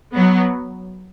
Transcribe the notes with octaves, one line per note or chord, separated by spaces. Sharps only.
F#3 B3